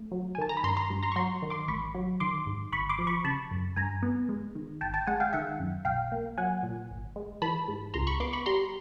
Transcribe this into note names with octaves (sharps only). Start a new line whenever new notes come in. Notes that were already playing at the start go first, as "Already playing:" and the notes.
Already playing: A3
F#3
G#5
D#3 A5
A#5
B5
G2 A#5 C6
A#5 C6
G2
A#5 C6
C#6
F#3 A#5 C6
D#3
C6 D6
A1 B5 C#6
F#3
D#3 C6 D6
G#2
G#1 B5 C#6
C6 D6
F3
B5 C#6
C#3 A5 B5
F#2
G2 G#5 A#5
B3
G#3
D#3
G#1 G5 A5
G5 A5
G#3 F#5 G#5
F5 G5
D#3 E5 F#5
F#2
B1 F5 G5
A#3
F#3 F#5 G#5
A#2
G#1
G#3
E3 A5 B5
G#2
C#2 A#5 C6
B5 C#6
B3 C6 D6
B5 C#6
G3 A#5 C6